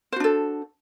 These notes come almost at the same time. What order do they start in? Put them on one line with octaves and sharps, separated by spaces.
C5 F#4 D4 A4